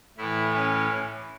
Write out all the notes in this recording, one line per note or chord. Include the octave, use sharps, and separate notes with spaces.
A2 E3 E4
C#4